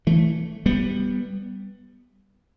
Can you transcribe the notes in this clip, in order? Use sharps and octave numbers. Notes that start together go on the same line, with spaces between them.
E3 A3
G3 B3